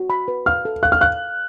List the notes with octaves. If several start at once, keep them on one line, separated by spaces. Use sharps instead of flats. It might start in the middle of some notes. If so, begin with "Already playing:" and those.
Already playing: F#4
B5
B4
F5 F6
A4
F5 F#6
F6
F5 F#6